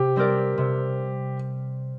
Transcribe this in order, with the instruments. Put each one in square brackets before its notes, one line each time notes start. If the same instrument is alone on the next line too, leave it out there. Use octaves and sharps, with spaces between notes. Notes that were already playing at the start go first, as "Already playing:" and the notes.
Already playing: [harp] C3 [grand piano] G4
[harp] G3 C4 A#4 D5
C3